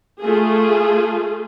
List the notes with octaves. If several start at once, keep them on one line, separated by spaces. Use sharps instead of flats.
A3 F4 G#4